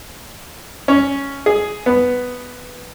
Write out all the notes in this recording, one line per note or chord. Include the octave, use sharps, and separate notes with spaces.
C#4
G#4
B3